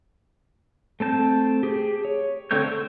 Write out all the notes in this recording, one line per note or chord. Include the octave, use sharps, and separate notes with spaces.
A3 C4 A5 G6
G4 G#4
C#5
D3 A3 C4 C#5 G6
C5